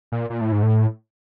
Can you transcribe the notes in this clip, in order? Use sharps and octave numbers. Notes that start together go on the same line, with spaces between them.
A#2
A#2
A2
G#2
A2